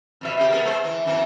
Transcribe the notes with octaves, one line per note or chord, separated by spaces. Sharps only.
F2 B2 E5
C#3 G4
B3 G#4 A#4
G#3 C5
E3
F#2 E3 C4